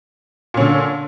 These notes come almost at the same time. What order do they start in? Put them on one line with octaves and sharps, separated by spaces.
A#2 C#4 D3